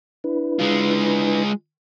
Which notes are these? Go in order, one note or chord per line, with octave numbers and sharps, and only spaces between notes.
D4 E4 B4
G#3 F4